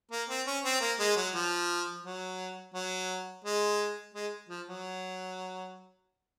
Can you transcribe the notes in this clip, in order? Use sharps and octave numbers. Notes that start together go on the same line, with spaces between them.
A#3
C4
C#4
C4
A#3
G#3
F#3
F3
F#3
F#3
G#3
G#3
F3
F#3